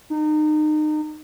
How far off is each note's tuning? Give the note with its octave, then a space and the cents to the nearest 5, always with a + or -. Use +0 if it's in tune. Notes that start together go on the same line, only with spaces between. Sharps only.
D#4 -30